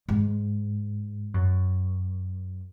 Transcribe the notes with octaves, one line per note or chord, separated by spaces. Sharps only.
G#2
F#2